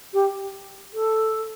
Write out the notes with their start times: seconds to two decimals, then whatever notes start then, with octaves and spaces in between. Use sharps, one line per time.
0.13 G4
0.93 A4